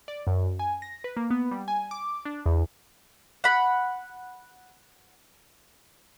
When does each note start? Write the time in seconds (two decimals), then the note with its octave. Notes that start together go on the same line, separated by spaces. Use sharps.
0.08 D5
0.27 F#2
0.59 G#5
0.82 A#6
1.04 B4
1.17 A#3
1.31 B3
1.51 G3
1.68 G#5
1.91 D6
2.25 D4
2.46 E2
3.44 F#5 B5